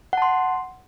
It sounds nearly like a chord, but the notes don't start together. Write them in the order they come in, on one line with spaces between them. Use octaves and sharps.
F#5 A5 C6